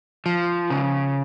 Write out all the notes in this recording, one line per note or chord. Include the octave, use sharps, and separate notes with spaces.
F3
C#3